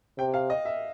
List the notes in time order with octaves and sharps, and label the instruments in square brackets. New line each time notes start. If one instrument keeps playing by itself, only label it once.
[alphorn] C3 [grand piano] G5
[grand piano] F5
D#5
E5